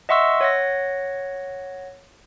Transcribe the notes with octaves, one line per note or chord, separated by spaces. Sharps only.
D#5 E5 F#5 C6 C#6 E6
C#5 F#5 A#6